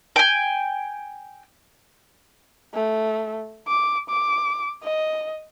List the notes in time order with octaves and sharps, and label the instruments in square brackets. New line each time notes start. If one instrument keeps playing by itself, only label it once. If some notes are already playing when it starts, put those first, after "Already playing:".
[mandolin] G5 G#5
[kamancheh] A3
D6
D6
D#5